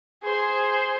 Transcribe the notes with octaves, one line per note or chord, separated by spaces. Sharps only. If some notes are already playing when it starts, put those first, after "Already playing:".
G#4 C5